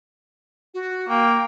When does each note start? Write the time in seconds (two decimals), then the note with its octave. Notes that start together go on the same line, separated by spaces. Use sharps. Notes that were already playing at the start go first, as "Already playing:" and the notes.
0.74 F#4
1.09 A#3 G5